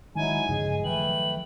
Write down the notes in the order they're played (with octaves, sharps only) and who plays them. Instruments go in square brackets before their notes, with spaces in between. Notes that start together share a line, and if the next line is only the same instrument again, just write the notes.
[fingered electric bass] D#3 G#3 [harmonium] F#3 D#4 E4 [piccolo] G#5
[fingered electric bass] G2 C#3 F3 [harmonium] G#3 G#4
[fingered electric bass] D#3 F3 F#3 [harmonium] A3 B4 G5 [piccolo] F#7